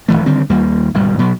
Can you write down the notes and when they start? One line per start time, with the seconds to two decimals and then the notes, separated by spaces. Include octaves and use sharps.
0.08 D1 G#1 E3 A3
0.26 D3 D#3 G3 C4
0.50 D#2 G3 A#3
0.94 D1 G#1 B2 G3
1.19 B2 F#3 B3